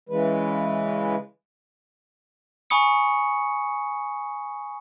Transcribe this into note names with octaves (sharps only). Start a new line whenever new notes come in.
C#3 E3 G#3 B4
G#5 B5 C#6 D#6 C#7